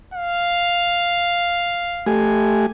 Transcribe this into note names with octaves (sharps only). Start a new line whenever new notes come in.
F5
A3 G4 G#5